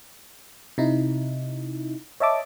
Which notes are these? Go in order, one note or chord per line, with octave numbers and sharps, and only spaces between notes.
C3 D#4 E4
C#5 D#5 E5 A5 D6